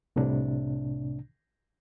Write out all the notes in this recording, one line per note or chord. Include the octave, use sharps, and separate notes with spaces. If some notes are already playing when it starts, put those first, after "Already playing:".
C2 A2 C3 D4